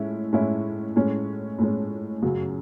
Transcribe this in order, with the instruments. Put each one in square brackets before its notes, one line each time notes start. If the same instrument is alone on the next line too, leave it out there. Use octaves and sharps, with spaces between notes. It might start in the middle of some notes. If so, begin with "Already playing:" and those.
Already playing: [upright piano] A2 G#3 C#4 E4
A2 G#3 C#4 E4
A2 G#3 C#4
A2 G#3 C#4
F#2 C#3 F#3